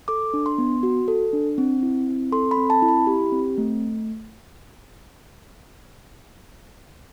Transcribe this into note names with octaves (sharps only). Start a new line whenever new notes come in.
A4 D6
D4
C6
B3
F#4
A4
D4
C4
E4
C4
A4 C6
B5
C4
A5
E4
B5
G4
C4
A3